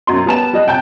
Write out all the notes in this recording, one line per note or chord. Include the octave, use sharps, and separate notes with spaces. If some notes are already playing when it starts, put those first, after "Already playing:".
F#2 B2 C6
G3 B3 A5 E7
G3 D#5 F#6
C3 G5 A5 G6